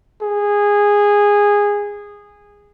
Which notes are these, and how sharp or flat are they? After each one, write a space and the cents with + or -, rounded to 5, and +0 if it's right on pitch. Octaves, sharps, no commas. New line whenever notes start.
G#4 -15